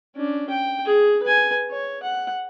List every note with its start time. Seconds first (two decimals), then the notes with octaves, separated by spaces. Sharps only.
0.16 C#4 D4
0.50 G5
0.86 G#4
1.23 B4 G#5
1.71 C#5
2.03 F#5